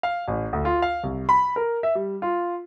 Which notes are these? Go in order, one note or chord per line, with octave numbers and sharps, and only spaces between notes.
F5
A1
D2
F4
F5
C2
B5
A#4
E5
G3
F4